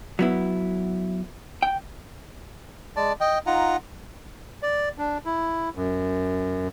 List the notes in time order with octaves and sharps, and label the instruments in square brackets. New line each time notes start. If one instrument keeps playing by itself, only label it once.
[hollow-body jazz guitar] F#3 B3 E4
G5
[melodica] G#3 D5 A5
D#5 G5
D#4 F4 F#5 A#5
[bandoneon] D5
D4
E4
F#2